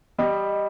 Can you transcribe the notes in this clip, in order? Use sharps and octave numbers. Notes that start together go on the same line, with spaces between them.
G3 D#5